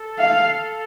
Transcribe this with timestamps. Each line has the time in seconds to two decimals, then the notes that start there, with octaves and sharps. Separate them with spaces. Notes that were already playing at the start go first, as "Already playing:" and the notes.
Already playing: A4
0.19 F5